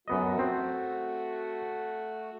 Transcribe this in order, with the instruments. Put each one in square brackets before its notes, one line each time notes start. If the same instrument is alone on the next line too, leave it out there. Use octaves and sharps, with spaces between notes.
[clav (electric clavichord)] F#2 B3 D#5 [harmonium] A3 F#4
[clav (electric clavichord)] C4